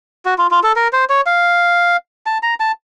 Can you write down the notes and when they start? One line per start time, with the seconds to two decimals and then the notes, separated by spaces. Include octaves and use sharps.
0.26 F#4
0.38 F4
0.51 F4
0.63 A4
0.76 A#4
0.93 C5
1.09 C#5
1.26 F5
2.26 A5
2.43 A#5
2.60 A5